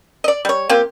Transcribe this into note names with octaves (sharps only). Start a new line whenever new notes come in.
D5 D#5
G3 C#5
A#3 C4 F4 G4